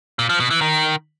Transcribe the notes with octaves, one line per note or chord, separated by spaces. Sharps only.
A#2
F3
B2
E3
D#3